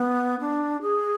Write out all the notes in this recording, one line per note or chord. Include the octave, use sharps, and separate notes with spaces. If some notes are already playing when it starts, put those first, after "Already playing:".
Already playing: B3
D4
G#4